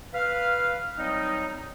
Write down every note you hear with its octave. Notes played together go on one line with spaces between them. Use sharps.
B4 F5
F#3 G3 C4 D#4